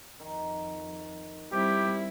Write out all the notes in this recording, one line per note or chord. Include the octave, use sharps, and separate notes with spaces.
F2 D#3
G3 C4 E4 G4